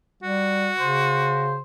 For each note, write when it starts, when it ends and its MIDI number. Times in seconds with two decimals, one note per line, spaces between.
0.23 0.71 55
0.23 1.59 66
0.79 1.61 49
0.79 1.60 72